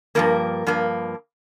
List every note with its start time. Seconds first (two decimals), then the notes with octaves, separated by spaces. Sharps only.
0.15 G2 F3 A#3 A#4
0.67 G2 F3 A#3